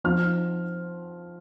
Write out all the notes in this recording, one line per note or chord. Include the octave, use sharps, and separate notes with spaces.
F3 C4 D#4 F6